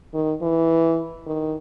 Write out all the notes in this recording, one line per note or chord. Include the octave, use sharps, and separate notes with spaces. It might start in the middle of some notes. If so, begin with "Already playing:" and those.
D#3
E3
D#3